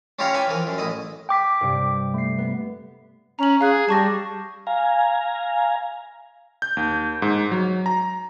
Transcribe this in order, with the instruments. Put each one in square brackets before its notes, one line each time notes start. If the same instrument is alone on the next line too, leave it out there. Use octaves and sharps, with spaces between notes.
[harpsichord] C#4 E4 F4 G4 C#5 A#5
B4 E5 G5 G#5
E3 F3 A#4
F#2
A1 E4 D#5
[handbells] G5 D6 B6
[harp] G2 C3
[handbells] A3 C7
[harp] B3
[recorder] C#4 [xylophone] A#5 F#7
[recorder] G#4 [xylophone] F5 F#6
[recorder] G3 [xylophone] A5 C#6 A#6
[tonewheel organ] F5 G#5 A#5
[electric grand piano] G6
D#2
G#2
F#3
A#5